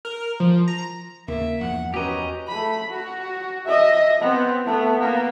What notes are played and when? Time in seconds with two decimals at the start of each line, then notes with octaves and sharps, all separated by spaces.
0.05 A#4
0.40 F3
0.68 A#5
1.28 D#2 C#3 A#3 E5
1.61 E2 G2 F3 F#5
1.94 C#4 F#4 G4 B4 D#5 A#5
2.48 A3 B5
2.90 F#4
3.66 D#5 E5
4.21 B3 C4
4.65 A3 B3
4.99 A#3 B3